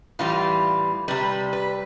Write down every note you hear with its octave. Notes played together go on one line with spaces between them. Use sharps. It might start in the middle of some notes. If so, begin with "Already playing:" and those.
A2 E3 G3 F4
C3 G3 B4
B4